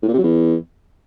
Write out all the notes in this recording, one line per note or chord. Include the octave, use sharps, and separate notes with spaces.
A2
A#2
C3
F#3
E2